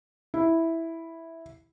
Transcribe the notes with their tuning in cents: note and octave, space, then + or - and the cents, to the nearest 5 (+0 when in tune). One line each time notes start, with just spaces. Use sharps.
E4 -5